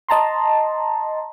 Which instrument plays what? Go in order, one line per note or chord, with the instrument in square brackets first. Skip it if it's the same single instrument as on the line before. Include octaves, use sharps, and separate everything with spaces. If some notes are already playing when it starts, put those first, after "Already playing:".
[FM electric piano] D#5 A5 A#5 C6